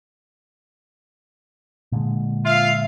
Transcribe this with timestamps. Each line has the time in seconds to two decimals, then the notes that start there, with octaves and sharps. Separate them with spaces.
1.92 A#2 D3 G#3
2.46 F4 E5 F5